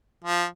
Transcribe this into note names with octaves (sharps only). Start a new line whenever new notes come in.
F3